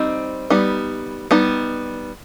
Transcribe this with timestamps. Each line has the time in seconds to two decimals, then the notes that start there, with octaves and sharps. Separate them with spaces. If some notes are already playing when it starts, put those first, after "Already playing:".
Already playing: G3 C4 D#4
0.50 G3 B3 D#4
1.31 G3 B3 D#4